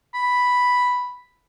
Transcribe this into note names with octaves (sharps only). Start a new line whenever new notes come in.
B5